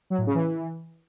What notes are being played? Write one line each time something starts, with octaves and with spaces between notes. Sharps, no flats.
F#3
A2
C#3
E3